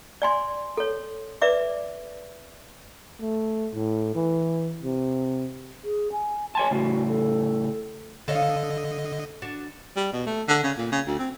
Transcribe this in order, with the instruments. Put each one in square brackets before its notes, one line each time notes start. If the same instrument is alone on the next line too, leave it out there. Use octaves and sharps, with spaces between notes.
[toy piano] D5 G#5 C6
A4 C#5
B4 D5 E5 D6
[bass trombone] A3
A2
E3
C3
[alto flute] G#4
G#5
[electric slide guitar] C#5 G#5 A5 [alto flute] C6
[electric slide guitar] A2 C#3 [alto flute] F#4
[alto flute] A4
[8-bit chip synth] D3 D#5 [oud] A4 C#5 F5
[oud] D4 F#4
[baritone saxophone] G3
B2
A3
D3
C#3
A#2
C#3
D2
C4